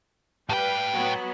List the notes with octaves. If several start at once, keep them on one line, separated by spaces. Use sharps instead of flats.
A2 G3 B4 F5 G5
F#3 B3